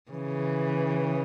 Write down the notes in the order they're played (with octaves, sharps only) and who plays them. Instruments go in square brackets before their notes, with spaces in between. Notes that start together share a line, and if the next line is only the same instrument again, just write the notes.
[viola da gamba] C#3 [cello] E3